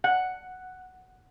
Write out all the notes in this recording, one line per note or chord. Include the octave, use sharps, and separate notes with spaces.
F#5